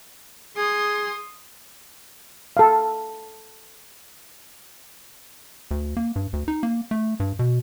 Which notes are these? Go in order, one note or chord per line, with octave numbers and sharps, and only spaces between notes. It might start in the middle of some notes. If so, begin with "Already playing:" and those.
G#4 C6 D#6
A4 F5
D2
A#3
G2
D2
D#4
A#3
A3
G2
B2